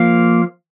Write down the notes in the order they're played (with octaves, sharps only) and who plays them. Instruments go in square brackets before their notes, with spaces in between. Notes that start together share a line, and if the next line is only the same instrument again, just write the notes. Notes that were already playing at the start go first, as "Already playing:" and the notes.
Already playing: [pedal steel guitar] F3 A#3 F5